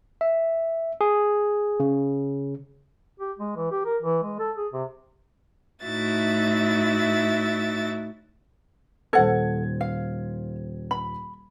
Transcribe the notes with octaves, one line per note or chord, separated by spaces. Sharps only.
E5
G#4
C#3
G4
G#3
E3
G4
A#4
E3
G#3
A4
G#4
C3
A2 D#4 E4 F#4 E5 A6
D#1 A4 C5 F#5 G#6
F5
B5